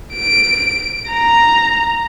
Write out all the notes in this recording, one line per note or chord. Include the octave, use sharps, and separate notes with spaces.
D7
A#5